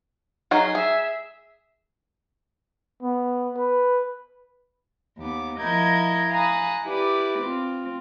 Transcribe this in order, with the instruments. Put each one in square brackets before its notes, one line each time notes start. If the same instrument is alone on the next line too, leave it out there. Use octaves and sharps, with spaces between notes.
[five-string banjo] F#3 D#4 G#4
[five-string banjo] G#4 [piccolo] E5
[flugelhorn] B3
B4
[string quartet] D#2 B3 D6
F3 E4 A#4 D#5 G6 G#6
F5 G#5 A#5 B5 D#6 F#6
E4 G4 B4 D5
C4 F4